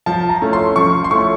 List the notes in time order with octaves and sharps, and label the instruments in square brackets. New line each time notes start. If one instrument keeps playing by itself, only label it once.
[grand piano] F3 A5
A#5
A3 C#4 E4
C6
F3 C#6
C6
A3 C#4 E4 C#6